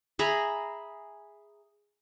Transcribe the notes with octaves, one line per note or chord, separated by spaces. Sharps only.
G#4 E5 A#5 B5